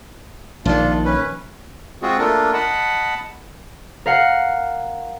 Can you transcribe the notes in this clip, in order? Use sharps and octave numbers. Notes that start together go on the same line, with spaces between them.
A#1 D#3 D4 F4
C#4 B4
G#3 C4 F4 F#4 G#4
A3 A#3 D4 F4 A4 A#4
D#5 F#5 A5 B5
A#4 F5 F#5